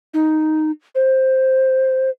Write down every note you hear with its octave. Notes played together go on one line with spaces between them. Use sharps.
D#4
C5